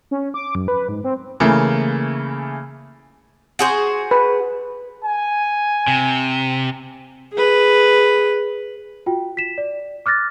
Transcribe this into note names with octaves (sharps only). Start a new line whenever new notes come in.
C#4
D6
F#2
B4
G#2
C4
C#3 E3 A3 A#3
F#4 G#4 C5
B4
G#5
C3
G#4 B4
F4 F#4 G5
B6 E7
D5
D6 F6 F#6 A6 A#6